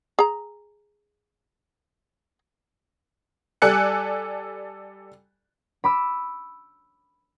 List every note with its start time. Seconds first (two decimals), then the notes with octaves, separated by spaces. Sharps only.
0.19 G#4 A#5
3.62 G3 A4 D5 G#5 F#6 C#7
5.84 B5 D6 E6